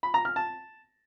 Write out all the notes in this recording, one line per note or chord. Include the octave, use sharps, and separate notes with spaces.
B5
A#5
F6
A5